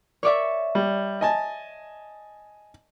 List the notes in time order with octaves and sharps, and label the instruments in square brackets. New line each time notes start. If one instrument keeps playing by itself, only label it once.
[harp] C#5 D5 E5
[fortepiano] G3
D#5 G#5 A5